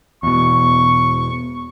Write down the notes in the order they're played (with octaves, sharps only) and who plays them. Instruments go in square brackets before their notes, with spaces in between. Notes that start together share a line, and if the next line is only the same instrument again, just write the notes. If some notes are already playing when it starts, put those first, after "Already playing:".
[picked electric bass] E2 B2 [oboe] C#6